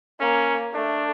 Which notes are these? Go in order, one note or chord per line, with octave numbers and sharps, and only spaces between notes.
A#3 C#4
A3 D4